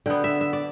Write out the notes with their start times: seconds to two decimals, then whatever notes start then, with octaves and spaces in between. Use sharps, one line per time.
0.06 D3 B3 G5
0.24 E5
0.41 E5
0.53 D5